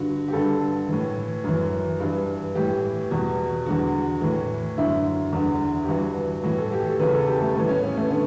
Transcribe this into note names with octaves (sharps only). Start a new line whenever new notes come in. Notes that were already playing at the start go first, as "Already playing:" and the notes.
Already playing: G2 D3 F#4
G4
G2 D3 A4
A2 E3
F#2 E3
G2 E3
A2 E3 G4
E2 B2
E2 D3 F#4
A2 E3
F#2 D3 E4
E2 D3
G4
G2 E3 F#4
A2 E3 F#4
A4
G4
A4
E2 C#3 E3 B4
A4
G4
A3
A2 E3 B3
C#4
B3
A3
D3 B3